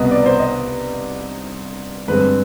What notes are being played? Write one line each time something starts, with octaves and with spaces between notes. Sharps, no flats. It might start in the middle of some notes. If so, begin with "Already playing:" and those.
Already playing: C2 B2 B3 D#5
D5
C5
D#5
G2 D3 G#3 C4 B4